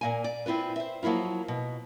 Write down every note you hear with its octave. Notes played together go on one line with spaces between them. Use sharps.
A#2 A#3 G#5
D5
C4 E4 F4 B4
C5 E5
F3 F#3 A#3 E4 F4
B2